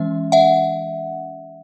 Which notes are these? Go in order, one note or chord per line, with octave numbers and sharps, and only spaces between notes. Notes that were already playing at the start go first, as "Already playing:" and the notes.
Already playing: E3 G#3 C#4 E5
E5 F#5